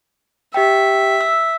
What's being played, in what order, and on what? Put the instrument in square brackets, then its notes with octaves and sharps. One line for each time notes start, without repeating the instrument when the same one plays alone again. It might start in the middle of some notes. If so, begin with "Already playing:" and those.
[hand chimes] G4 G5 [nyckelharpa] E5
[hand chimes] E6